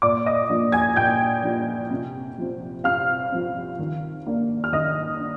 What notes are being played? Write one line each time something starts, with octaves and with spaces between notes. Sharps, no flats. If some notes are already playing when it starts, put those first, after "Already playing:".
A#2 D5 D6
D#5 D#6
F3 A#3 D4
G#5 G#6
A#2 G5 G6
F3 A#3 D4
C3
F3 C4
C3 F5 F6
F3 C4
D#3
A#3 D4
F6
D#3 D#5 D#6
D4